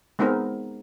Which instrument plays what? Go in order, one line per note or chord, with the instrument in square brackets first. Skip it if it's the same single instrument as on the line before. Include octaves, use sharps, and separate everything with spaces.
[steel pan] G#3 B3 C4 D#4 A#4